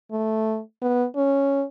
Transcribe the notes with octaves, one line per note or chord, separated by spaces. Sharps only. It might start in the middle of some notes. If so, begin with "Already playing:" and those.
A3
B3
C#4